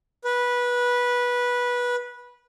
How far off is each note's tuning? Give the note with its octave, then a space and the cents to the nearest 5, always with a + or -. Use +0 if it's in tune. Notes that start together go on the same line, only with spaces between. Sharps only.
B4 -15